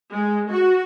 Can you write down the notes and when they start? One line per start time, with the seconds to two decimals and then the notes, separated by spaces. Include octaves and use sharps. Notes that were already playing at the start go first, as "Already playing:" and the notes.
0.12 G#3
0.49 F#4